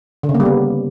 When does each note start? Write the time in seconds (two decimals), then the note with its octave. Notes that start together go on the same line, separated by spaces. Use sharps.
0.23 D3
0.29 C#3
0.34 A#3
0.40 G3
0.45 B3